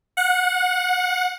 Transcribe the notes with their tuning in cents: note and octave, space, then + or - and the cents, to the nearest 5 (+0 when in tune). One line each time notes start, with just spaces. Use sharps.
F#5 -20